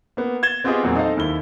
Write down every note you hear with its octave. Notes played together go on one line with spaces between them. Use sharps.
A#3 B3
G#6 A6 E7 G7
B3 C4 F4 G4 G#4 D#5
E2 A#2 F#3 A#3 C4
D#4 A4 C5 D#5 F5
D#2 D#3 E4 G7